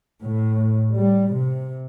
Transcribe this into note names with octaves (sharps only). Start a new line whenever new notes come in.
A2
G3
C3